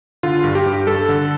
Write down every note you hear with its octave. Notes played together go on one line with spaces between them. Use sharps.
D3 F4
G2
G4
G2
G2 A4
D3